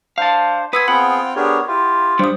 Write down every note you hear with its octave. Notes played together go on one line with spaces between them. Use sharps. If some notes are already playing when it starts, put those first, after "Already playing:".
D4 C5 F5 A5
B4 F#5 G#5 C6 D#6 E6 G#6
B3 C4 F4 G#4 F#5 G5 B5
B3 D4 G4 G#4 A#4 C#5
E4 F4 G4
G3 D4 C5 D#6